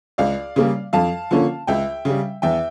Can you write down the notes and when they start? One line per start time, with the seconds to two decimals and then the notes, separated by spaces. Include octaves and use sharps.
0.18 C#2 D5 F5
0.56 C#3 G3 A#3
0.93 F2 F5 A5
1.31 D3 F3 A#3 C#4
1.67 C#2 E5 G5
2.05 C#3 G3
2.42 E2 E5 G5